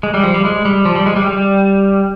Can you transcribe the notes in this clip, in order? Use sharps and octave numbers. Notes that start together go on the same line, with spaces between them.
G#3
G3
F3
G3
G#3
G3
F3
G3
G#3
G3
G3